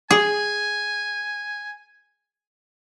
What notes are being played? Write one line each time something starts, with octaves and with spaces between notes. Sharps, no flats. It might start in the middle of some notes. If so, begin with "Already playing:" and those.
G#4 G#5